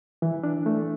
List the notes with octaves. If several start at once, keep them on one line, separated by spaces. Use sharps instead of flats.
E3
D4
A3